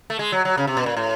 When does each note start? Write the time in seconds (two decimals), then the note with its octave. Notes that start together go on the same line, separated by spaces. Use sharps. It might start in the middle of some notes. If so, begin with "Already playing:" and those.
0.10 A3
0.19 G#3
0.32 F#3
0.45 F#3
0.58 C#3
0.67 C3
0.77 B2
0.86 A#2
0.97 A2